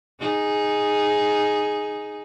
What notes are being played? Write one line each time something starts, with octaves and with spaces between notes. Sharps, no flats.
D#4 G#4